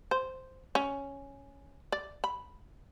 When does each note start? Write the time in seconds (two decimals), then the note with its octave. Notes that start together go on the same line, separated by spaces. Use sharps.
0.11 C5
0.75 C#4
1.92 D5
2.24 B5